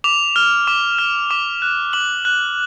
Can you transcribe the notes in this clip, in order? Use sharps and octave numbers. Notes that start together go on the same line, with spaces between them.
D6 F7
F6
D6
F6
D6
F#6
D6 F#7
F#6